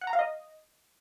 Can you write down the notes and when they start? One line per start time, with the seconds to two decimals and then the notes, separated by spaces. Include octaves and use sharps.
0.01 F#5
0.07 A#5
0.13 F5
0.19 D#5